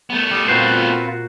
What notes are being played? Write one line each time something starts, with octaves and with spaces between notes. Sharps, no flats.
A3 B3
G3 D6 D#6
A#2 C4 F4 F#4 B4 C5